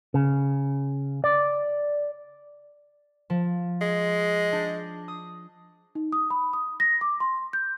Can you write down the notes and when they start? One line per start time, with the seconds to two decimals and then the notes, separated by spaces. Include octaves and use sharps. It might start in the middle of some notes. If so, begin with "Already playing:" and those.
0.14 C#3
1.24 D5
3.30 F3
3.81 G#3
4.52 D4 G6
5.08 D#6
5.95 D#4
6.12 D#6
6.30 B5
6.53 D#6
6.80 A#6
7.01 D6
7.20 C6
7.53 G6